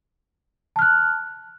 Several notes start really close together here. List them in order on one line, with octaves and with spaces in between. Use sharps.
A5 F6 F#6